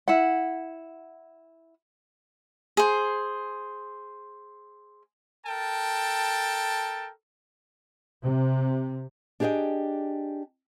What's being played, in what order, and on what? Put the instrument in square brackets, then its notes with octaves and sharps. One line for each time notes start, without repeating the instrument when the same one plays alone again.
[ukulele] E4 F#5
[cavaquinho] G#4 C5
[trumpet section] A4 A#4 G5 A5
[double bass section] C3
[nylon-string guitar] D4 G4 G#4 C#5 D#5 G5